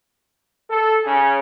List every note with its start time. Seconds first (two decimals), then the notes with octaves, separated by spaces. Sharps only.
0.69 A4
1.05 C#3 C#4 G#4